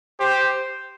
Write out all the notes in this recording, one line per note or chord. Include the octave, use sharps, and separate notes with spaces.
G4 C5